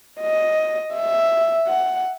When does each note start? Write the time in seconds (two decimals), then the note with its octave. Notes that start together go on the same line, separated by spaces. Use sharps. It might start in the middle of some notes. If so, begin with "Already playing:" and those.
0.21 D#5
0.94 E5
1.67 F#5